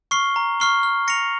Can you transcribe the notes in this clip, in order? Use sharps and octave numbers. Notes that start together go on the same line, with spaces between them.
C#6 F6 C7 G7
A#5
C#6 F6 C7 G7
F6
A#6 C#7 F7